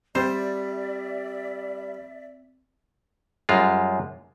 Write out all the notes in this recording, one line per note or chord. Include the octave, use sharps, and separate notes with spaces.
G3 C4 C5 D5 E5
F#2 G3 G#3 F4